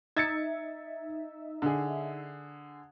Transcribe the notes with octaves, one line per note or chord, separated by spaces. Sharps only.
D#4 E5 G#6 A6 C#7
D3 G#4